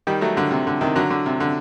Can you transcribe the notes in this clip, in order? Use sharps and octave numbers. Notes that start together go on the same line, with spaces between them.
D#3 G3
F#3 A3
D3 F#3
C3
D3
C3 D#3
D3 F#3
D3
C3
D3